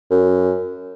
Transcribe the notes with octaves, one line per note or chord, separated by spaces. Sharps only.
F#2